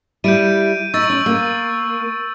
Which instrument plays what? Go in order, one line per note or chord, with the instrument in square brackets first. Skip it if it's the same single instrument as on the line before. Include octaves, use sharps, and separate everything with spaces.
[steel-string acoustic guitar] G3 E4 [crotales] G6 D7 D#7
[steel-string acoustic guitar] D#4 [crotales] C#6 E6 A6
[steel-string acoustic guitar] C#4
A#3